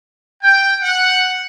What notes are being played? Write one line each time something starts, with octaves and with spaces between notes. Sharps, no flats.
G5
F#5